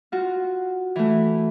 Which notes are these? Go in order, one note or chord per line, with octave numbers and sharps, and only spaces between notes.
F4 F#4
E3 A3